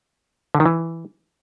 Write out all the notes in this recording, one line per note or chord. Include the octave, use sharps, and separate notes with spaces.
D3
D#3
E3